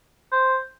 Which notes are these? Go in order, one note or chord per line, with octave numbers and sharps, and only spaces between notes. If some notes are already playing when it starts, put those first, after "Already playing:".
C5